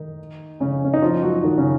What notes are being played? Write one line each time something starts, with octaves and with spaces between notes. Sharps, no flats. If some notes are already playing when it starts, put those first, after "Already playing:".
Already playing: D#3 D#4
C#3 C#4
C#4
D#4
F3 F4
F#3 F#4
D#3 D#4
C#3 C#4